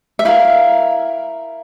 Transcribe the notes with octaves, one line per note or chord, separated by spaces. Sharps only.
E5
E4 G4 A#4 F5